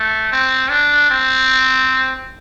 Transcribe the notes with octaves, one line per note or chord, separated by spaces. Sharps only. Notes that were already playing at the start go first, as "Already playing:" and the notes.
Already playing: A3
C4
D4
C4